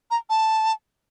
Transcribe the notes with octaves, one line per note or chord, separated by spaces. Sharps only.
A#5
A5